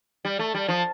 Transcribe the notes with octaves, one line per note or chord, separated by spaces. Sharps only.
G3
A3
G3
F3